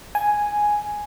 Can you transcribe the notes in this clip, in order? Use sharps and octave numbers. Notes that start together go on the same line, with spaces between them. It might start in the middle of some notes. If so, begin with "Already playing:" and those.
G#5